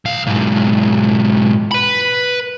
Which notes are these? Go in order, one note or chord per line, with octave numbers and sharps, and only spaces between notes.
B1 F5
B1 G#2
B4 B5